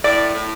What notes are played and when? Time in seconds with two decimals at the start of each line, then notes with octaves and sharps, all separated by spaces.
0.04 A2 D5
0.35 A2